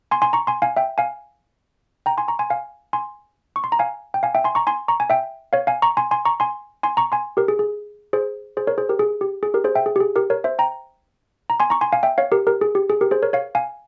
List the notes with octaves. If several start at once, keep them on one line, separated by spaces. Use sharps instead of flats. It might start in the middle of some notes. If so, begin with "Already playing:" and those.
G#5 C6
G#5 C6
A#5 C#6
G#5 C6
F5 G#5
E5 G5
F5 G#5
G5 A#5
G#5 C6
A#5 C#6
G#5 C6
F5 G#5
G#5 C6
C#6
C6
A#5
F5 G#5
G5
F5 G#5
E5 G5
G#5 C6
A#5 C#6
G#5 C6
A#5 C#6
G#5
E5 G5
C#5 F5
F5 G#5
A#5 C#6
G#5 C6
G#5 C6
A#5 C#6
G#5 C6
G#5 C6
A#5 C#6
G#5 C6
G4 A#4
G#4
G#4
G#4 C5
G#4 C5
A#4 C#5
G#4 C5
G4 A#4
G#4
G4
G#4
G4 A#4
G#4 C5
E5 G5
G#4
G4
G#4
G4 A#4
A#4 C#5
C5 E5
G5 A#5
A#5
G#5 C6
A#5 C#6
G#5 C6
F5 G#5
E5 G5
C#5 F5
G4 A#4
G4 A#4
G#4
G4
G#4
G4 A#4
G#4 C5
A#4 C#5
C#5 F5
F5 G#5